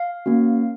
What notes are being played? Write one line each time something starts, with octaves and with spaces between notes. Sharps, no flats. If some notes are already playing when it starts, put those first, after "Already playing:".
Already playing: F5
A#3 C#4 F#4